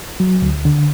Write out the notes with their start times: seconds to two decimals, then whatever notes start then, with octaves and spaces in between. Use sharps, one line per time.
0.20 F#3
0.42 D2
0.65 D3